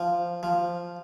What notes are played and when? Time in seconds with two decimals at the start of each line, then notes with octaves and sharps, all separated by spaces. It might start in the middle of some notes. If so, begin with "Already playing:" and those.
Already playing: F3
0.43 F3